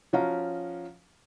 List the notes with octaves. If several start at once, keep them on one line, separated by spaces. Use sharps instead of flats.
F3 C#4 F#4 F5 A#5